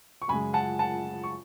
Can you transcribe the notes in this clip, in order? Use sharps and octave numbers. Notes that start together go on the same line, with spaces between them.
C#6
F#2 C#3 G#3 G#5 B5
F#5 A5
F#5 A5
C#6